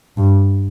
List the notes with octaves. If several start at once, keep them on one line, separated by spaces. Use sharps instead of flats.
G2